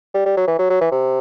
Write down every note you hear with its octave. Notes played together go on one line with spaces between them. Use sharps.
G3
G3
F#3
E3
F#3
F#3
E3
C3